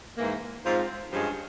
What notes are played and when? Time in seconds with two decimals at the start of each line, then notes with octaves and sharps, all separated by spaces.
0.17 G#2 E3 A#3
0.64 G#2 F3 C4 F4 C5
1.12 G2 F3 G#3 C#4